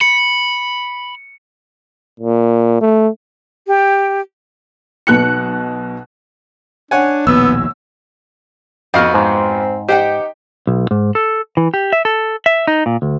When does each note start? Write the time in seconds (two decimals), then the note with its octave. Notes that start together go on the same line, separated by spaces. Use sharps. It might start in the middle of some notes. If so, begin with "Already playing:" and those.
0.01 B5 C#7
2.20 A#2
2.81 A3
3.67 G4
5.07 B1 B2 F#6 C#7
6.91 D4 C#5 F#5 G#5
7.27 A#1 D#2 B2 B3 E6
8.94 F2 B3 D#4 F#4 C5 F5 F6
9.14 G#2 C4
9.88 D#4 G4 C5 F#5 G5
10.67 B1
10.91 G#2
11.15 A4
11.57 E3
11.74 G4
11.93 E5
12.05 A4
12.46 E5
12.67 D#4
12.86 A#2
13.02 D2